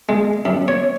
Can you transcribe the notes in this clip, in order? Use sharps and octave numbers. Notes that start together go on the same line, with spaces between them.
G#3
F#2
C#5